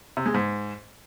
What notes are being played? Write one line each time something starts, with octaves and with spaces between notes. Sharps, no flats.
C3
G#3
G#2